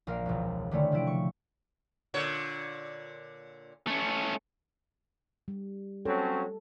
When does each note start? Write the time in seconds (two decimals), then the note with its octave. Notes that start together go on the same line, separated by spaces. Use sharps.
0.07 A#1 A#4 F5
0.26 E1 C#2
0.71 D3 D#3 A3 C4 C#4 E4
0.92 C3 F3 E4 D7
1.07 C#6
2.14 A#2 D3 C#5
3.87 A3 C#4
5.48 G3
6.06 F#3 C4 C#4 A4